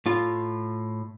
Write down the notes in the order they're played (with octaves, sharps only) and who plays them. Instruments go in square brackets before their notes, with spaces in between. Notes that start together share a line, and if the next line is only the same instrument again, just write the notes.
[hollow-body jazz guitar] A2 F4